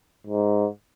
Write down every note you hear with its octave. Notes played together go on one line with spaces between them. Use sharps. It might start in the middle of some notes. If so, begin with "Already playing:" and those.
G#2